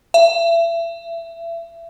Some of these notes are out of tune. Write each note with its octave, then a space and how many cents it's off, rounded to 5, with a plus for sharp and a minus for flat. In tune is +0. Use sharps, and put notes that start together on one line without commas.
E5 +30